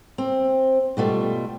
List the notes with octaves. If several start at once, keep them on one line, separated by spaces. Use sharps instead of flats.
C4
B2 G3 A3 F4